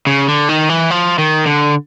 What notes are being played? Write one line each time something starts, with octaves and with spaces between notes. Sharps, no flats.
C#3
D3
D#3
E3
F3
D#3
D3